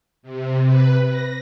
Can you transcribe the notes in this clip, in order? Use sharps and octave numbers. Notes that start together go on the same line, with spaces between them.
C3
B4
A#6